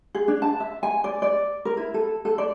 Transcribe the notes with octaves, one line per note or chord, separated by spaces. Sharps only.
G#4
D4
A5
E5
G#5
D5
D5
A#4
E4
A4
A4
D5